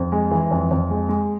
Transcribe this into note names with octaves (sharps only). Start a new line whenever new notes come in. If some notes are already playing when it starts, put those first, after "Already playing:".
Already playing: F2
G#3
E3
F2
F2
G#3
G#3